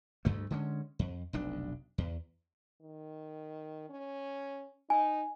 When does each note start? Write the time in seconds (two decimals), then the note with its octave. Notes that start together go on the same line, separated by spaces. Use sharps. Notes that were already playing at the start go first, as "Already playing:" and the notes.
0.25 D2 G2 A3
0.51 D3 G#3 A3 C#4
0.99 F2
1.33 F1 B1 D4
1.98 E2
2.81 D#3
3.89 C#4
4.90 D#4 G#5